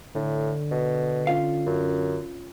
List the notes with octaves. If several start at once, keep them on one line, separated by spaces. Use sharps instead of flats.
A2 D3
B2
C#4 F4 F5
F#2